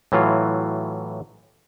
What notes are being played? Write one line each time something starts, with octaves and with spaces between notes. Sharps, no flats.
A2 E3 F#3 F4